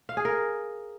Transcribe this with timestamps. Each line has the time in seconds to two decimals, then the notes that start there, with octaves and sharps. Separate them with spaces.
0.09 F5
0.17 G#4
0.25 A#4